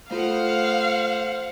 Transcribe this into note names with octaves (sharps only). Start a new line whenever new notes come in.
A3 F4 A4 C5 F5 F#5